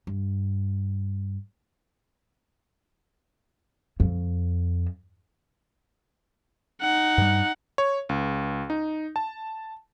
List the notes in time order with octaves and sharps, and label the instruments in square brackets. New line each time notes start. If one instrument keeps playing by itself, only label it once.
[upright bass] G2
F2
[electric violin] D#4 F#5
[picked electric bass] G2 G3
[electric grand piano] C#5
C#2
D#4
A5